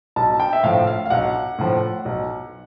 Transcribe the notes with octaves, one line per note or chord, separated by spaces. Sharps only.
B1 A5
G5
E5
A2 F3 F5
F5
F5
B1 F#5
A2 F3
B1